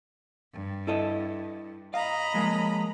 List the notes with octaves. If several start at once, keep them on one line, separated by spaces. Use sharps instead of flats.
G2
E4 A4 D#5
D#5 F5 A#5 B5
F3 G#3 A#3